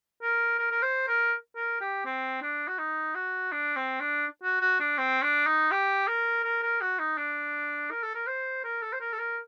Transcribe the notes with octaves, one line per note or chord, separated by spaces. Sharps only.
A#4
A#4
A#4
C5
A#4
A#4
G4
C4
D4
F#4
D#4
F#4
D4
C4
D4
F#4
F#4
D4
C4
D4
D#4
G4
A#4
A#4
A#4
F#4
D#4
D4
A#4
A4
A#4
C5
A#4
A4
C5
A#4
A4
A#4